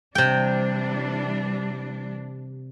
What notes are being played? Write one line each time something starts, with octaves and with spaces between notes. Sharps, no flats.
C3 E3 G3 D4 G5